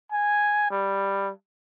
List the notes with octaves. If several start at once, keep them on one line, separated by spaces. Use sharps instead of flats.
G#5
G3